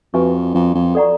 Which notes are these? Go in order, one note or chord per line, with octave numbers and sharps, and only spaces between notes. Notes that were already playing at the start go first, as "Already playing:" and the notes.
F2 F#4 B4 E5 G#5 C#6
F2
F2
A4 D5 F#5 A#5 C#6